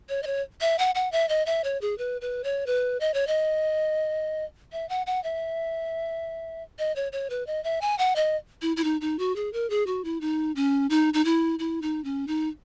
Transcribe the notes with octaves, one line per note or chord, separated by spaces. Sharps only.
C#5
D#5
C#5
E5
F#5
F#5
E5
D#5
E5
C#5
G#4
B4
B4
C#5
B4
D#5
C#5
D#5
E5
F#5
F#5
E5
D#5
C#5
C#5
B4
D#5
E5
G#5
F#5
D#5
E4
E4
D#4
D#4
F#4
G#4
A#4
G#4
F#4
E4
D#4
C#4
D#4
D#4
E4
E4
D#4
C#4
D#4